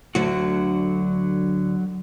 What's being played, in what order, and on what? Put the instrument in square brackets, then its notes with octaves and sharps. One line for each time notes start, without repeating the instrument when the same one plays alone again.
[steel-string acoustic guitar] D2 D3 [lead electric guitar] F#3 F#4